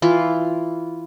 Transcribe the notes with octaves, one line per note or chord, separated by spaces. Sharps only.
E3 F4